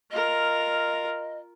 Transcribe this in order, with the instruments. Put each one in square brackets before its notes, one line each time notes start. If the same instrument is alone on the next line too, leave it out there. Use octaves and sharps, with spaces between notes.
[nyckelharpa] F4 A#4 [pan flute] D#5